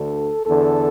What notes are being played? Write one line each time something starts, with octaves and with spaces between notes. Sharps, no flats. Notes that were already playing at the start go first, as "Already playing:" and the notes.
Already playing: D2 D3 A4
E2 D3 A4